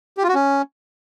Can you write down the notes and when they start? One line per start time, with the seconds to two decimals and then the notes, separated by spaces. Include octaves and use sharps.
0.18 G4
0.23 F4
0.29 F#4
0.35 C#4